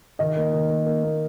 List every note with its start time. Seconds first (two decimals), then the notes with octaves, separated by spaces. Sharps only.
0.19 D#3 D#5
0.37 A#3
0.53 D#3
0.70 A#3
0.86 A#3
1.03 A#3